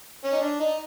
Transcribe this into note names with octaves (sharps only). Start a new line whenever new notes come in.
C#4
D#4
D4
D#4